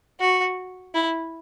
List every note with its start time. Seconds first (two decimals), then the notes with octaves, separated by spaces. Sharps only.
0.20 F#4
0.94 E4